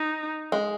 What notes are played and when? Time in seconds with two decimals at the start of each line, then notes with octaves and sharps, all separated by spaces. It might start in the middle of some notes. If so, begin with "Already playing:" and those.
Already playing: D#4
0.52 G#3